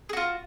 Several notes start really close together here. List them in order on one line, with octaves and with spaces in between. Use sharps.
G#4 F#4 F4